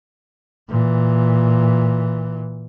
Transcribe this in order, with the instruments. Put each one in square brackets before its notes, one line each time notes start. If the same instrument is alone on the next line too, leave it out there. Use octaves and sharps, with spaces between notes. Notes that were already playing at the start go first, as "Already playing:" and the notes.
[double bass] A#2 E3